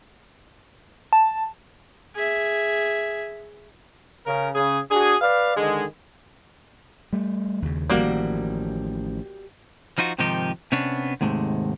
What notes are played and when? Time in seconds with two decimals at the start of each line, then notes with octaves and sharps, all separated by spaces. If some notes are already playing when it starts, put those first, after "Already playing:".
1.13 A5
2.15 G#4 E5
4.27 C#3 A#4
4.55 C#3 G#4
4.91 D4 F#4 G#4
5.21 B4 D5 F5
5.57 D3 D#3 G#3
7.13 G3 A3
7.62 D#2 C#3
7.90 A1 D#3 F3 G3 A#3 F#4
9.98 F3 D#4 F4 F#4
10.18 G#2 C3 D#3 F3 D#4 G4
10.72 C3 B3 C#4 D4
11.21 D#2 G#2 C3 G#3 A3